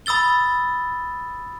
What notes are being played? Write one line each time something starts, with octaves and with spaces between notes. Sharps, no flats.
B5 D#6 E6 A6 G7